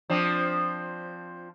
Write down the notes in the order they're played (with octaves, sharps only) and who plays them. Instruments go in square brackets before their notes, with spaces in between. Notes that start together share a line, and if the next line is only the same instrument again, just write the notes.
[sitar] F3 C4 D4